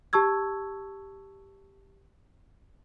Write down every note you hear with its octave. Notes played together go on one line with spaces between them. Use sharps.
G4 A5 C#6 E6 G#6